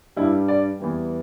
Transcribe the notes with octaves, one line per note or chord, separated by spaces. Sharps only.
G2 G3 E4
D5
E2 E3 G3